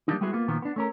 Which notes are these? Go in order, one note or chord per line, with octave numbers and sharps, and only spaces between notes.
F3 G3 A3 A#3 D4 D#4
G3 G#3 B3 E4 F#4 G#4
A#3 B3 F4
A#2 D#3 F3 B3
B3 D4
A3 C#4 A#4